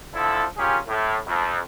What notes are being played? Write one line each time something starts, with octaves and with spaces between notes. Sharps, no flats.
D3 F3 E4 A4
C#4 F4 G4 G#4 A#4
A2
F2